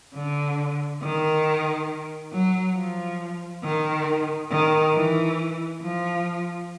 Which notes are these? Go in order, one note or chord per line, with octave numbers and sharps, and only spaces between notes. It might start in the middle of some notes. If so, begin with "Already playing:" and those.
D3
D#3
F#3
F3
D#3
D#3
E3
F3